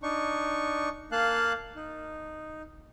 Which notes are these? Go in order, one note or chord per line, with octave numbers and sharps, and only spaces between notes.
D4 D#4 C#6
A#3 F5 A5 F#6
D#4